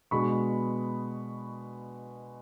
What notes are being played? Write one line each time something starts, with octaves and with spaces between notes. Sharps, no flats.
B2 G#3 B3 D4 B5 C#6